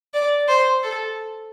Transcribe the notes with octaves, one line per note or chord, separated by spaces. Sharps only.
D5
C5
A4